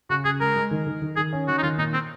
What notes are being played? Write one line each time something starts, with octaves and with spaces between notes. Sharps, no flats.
C#3 F#4
C#3 G#4
G#3 A#4
G#3
D#3
D#3
D#3
D#3 G#4
C#4
D#3 F#4
D#4
D#3 F4
A#2 D#4
C4